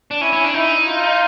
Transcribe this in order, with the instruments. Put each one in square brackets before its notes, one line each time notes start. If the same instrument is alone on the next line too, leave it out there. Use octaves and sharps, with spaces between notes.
[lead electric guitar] D4
[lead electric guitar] C#4 [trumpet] E4
[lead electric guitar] C#4
D4
[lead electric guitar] D#4 [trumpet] E4
[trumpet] F4